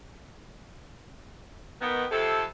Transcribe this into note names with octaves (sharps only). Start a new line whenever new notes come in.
D#3 B3
F2 C3 A4